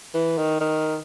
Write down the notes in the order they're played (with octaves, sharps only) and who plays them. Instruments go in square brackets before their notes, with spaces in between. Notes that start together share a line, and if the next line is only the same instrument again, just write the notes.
[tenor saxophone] E3
D#3
D#3